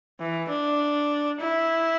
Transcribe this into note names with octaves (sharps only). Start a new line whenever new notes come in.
E3
D4
E4